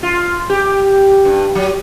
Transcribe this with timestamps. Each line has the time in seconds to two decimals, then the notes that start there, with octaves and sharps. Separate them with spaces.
0.03 F4
0.50 G4
1.25 G2
1.55 F#3